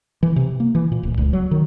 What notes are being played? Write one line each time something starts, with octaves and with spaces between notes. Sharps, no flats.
E3
C3
A#3
E3
A#2
D1
C#2
F#3
D#3